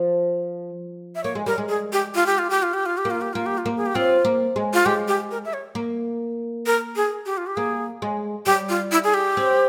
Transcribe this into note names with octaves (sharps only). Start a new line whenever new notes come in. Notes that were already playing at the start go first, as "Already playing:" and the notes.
Already playing: F3
E5
A#3 C#5
G#3
G3 A#4
G#3
G#4
G4
F4
G4
F4
G4
F4
G4
F4
G4
A#3
F4
G4
A#3 F4
G4
F4
A#3
G#4
G4
C4 F4
A#3
G#3
F4
G#3 G4
G4
A#4
E5
C#5
A#3
A#4
G#4
G4
F4
G4
A#3 G#4
G#3
G3 G4
F4
E4
G#4
G4
C4